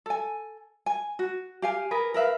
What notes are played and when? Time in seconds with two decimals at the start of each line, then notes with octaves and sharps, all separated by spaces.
0.06 A4 G#5
0.86 G#5
1.19 F#4
1.62 G4 F5 G#5
1.91 G#4 A#4 B4
2.14 A#4 B4 E5 F5